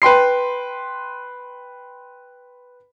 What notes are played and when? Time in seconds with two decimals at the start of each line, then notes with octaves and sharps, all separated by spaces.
0.02 B4 G5 C6 C7